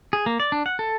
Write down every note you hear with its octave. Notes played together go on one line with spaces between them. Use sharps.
G#4
A#3
D5
D4
F#5
A4